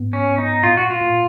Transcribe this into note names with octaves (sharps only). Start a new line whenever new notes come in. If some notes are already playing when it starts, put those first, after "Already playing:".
Already playing: G#2 B3
C#4
B3
D#4
A#2 F4
F#4
F4
A#2